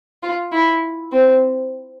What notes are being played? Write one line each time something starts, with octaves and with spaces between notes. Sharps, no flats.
F4
E4
C4